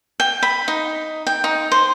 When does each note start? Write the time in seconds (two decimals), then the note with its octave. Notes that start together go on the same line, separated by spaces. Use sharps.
0.20 G5
0.43 B5
0.68 D#4
1.27 G5
1.44 D#4
1.72 C5